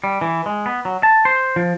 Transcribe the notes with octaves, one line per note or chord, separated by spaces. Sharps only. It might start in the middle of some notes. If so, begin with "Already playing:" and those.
G3
E3
G#3
B3
F#3
A5
C5
F3